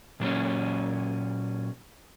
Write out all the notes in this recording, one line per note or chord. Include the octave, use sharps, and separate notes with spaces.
A#2 F#3 A#3 C#4